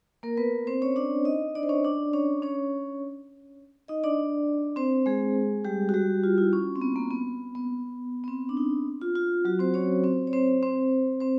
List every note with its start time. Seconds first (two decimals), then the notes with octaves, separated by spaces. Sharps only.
0.23 A#3 A#4
0.37 B3 B4
0.67 C4 C5
0.82 C#4 C#5
0.96 D4 D5
1.25 D#4 D#5
1.55 D4 D5
1.63 C5
1.69 C#4 C#5
1.84 D4 D5
2.13 C#4 C#5
2.42 C#4 C#5
3.88 D#4 D#5
4.04 D4 D5
4.76 C4 C5
5.06 G#3 G#4
5.65 G3 G4
5.89 F#4
5.94 G3 G4
6.23 F4
6.38 E4
6.53 C#4
6.76 C4
6.81 B3
6.96 A#3
7.11 B3
7.55 B3
8.24 B3
8.28 C4
8.49 D4
8.57 D#4
9.01 F4
9.16 F4
9.45 F#3 F#4
9.59 C4 C5
9.74 C#4 C#5
10.04 C4 C5
10.27 C#5
10.33 C4 C5
10.63 C4 C5
11.20 C4 C5